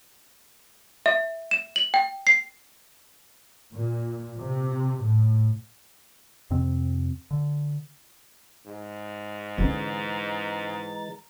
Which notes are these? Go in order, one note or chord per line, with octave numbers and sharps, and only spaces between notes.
E5
E7
F#7
G5
C7
A#2
C3
A2
F2 C3 C4
D3
G#2
D3 E3 G#3 C#4 A#5 A6